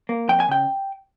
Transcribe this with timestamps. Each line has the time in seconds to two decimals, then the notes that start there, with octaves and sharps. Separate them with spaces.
0.09 A#3
0.29 F2 G5
0.40 G#5
0.48 C#3 G5